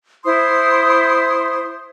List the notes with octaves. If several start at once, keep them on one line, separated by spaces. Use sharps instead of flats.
E4 C5 C6 D#6